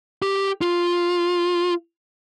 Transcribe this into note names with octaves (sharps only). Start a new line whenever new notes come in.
G4
F4